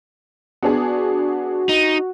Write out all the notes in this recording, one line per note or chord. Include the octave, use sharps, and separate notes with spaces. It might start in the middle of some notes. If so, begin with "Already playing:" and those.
B3 D4 F#4 G#4
D#4